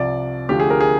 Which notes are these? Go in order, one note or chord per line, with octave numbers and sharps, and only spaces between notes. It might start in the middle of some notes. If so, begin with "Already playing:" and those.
Already playing: C2 C3 F3 D5
D2 D3 F3 G4
G#4
A#4
G#4